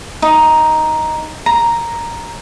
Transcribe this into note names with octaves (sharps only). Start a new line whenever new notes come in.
D#4
A#5